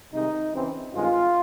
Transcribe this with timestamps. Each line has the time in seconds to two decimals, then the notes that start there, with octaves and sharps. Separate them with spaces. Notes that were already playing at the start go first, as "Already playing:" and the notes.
0.13 C2 C3 D#3 G#3 D#4
0.53 C#2 C#3 E3 G#3 C4
0.93 G2 D#3 G#3 C4 F4